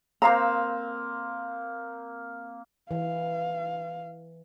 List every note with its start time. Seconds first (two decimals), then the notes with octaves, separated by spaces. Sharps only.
0.22 A#3 C4 C5 F5 A#5 E6
2.91 E3 F5